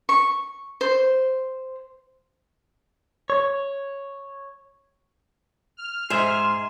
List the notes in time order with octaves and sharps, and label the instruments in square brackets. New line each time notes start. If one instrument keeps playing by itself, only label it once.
[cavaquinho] C#6
C5
[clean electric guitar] C#5
[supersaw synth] F6
[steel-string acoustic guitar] G#2 [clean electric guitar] G#4 E5 [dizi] C6